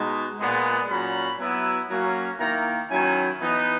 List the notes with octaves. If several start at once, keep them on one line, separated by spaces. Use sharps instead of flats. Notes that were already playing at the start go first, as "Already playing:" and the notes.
Already playing: B2 G#3 D#4
A#2 G#3 B3
A#2 F#3 C#4 B5
F#3 B3 E4
F#3 A#3 C#4
D#3 A#3 E4 A#5
D#3 F#3 C#4 E4 G#5
E3 B3 D#4